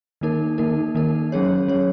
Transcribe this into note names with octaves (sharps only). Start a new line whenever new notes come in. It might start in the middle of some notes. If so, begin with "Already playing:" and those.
D#3 A#3 D#4 A#4
D#3 A#3 D#4 A#4
D#3 A#3 D#4 A#4
F#3 C#4 G#4 C#5
F#3 C#4 G#4 C#5